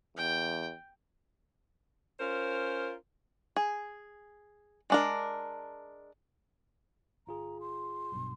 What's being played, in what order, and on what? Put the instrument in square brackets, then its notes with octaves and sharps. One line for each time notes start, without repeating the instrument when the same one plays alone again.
[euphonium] E2 [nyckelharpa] G5
[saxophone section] C#4 F4 A#4 C5
[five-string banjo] G#4
G#3 D4 A#4
[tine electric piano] G1 F4 G#4 [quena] A#5
[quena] C6
[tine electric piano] B1 G2 B2